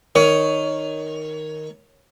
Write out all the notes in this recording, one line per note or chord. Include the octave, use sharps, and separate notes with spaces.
D#3 C#5